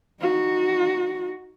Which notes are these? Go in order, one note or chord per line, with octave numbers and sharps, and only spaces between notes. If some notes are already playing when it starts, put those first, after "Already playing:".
D#4 F#4